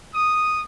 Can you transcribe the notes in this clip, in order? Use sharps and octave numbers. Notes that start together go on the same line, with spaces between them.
D#6